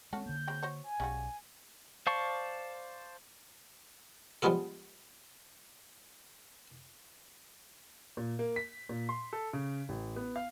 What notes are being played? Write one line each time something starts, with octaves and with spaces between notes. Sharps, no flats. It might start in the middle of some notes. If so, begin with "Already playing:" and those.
G#3 C4 C#4 F#4 A4
D3 A#3 G6
F#3 G#3 C4
F#4 C5 C#5
G#5
B1 C#3 G3 F#4
C5 D5 F5 A5 C#6
F3 G3 G#3 B3 F4 A4
A#2
A#3
B6
A#2
C6
A4
C#3
A1
B3
F5